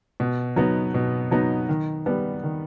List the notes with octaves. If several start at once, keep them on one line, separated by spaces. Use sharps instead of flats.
B2
F#3 B3 D#4
B2
F#3 B3 D#4
D#3
G3 B3
D#3